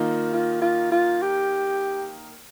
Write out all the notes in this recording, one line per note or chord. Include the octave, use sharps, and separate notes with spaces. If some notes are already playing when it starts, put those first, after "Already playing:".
Already playing: D#3 A#3 D#4 F4
F4
F4
F4
G4